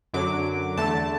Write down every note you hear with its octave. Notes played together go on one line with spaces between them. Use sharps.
F#2 D3 F#3 D6
E2 D3 A3 A5